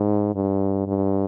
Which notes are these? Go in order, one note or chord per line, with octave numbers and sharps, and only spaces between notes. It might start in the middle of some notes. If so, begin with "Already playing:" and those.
Already playing: G#2
G2
G2